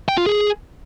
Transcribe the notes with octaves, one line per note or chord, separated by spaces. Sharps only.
G5
F4
G#4